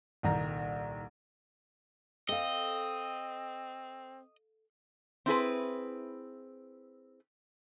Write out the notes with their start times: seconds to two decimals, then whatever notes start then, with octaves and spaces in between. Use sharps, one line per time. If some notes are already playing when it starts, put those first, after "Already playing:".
0.23 D#1 C2 D#3 A#5
2.29 C4 A4 D#5 F5
5.26 C4 E4 G#4 B4